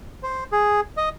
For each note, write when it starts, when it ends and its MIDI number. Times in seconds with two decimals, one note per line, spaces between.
0.23 0.44 72
0.52 0.80 68
0.97 1.09 75